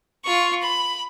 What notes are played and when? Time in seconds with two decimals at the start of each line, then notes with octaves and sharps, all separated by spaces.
0.24 F4 C#6
0.62 B5